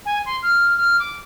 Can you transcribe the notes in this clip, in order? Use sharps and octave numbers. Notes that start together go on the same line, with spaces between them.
G#5
C6
F6
F6
D6